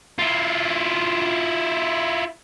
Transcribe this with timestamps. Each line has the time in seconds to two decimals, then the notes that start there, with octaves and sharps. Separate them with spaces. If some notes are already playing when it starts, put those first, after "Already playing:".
0.18 E4 F4